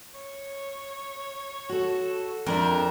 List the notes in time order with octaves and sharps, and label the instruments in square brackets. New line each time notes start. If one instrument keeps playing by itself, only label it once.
[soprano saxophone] C#5
[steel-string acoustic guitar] F#4 A4
[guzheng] F2 [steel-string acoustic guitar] C4 D4 E5 [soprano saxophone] A#4